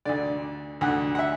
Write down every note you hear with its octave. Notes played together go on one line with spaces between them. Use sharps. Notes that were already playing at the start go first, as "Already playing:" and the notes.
D2 D3 D5
D2 D3 F#5
F#5
E5